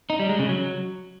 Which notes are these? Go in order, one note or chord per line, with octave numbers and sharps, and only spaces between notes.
D#4
G3
G#3
C#3
F#3